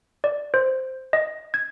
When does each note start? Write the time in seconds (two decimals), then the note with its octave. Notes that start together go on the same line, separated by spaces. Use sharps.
0.24 D5
0.54 C5
1.13 D#5
1.54 G#6